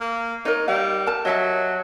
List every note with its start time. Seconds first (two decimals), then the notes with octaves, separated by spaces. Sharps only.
0.01 A#3
0.45 D#4 A#4 C#5
0.68 G3 F5
1.06 A#4 A5
1.25 F#3 D#5 E5 A5